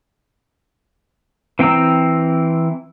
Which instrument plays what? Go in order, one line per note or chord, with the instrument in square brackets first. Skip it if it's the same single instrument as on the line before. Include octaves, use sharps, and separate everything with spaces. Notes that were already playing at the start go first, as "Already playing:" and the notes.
[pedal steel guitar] E3 C4 G5 A#5 E6